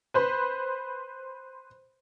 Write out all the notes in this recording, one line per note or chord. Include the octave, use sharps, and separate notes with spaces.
B4 C5 B5